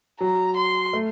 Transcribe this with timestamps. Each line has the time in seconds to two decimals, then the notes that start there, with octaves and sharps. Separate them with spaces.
0.20 F#3 A#5
0.57 C6
0.93 A3